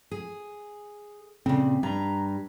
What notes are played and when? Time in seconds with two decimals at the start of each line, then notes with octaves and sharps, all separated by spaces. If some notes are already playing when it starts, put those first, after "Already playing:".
0.11 G#4
1.46 A#2 C#3 C4
1.83 G2 A#5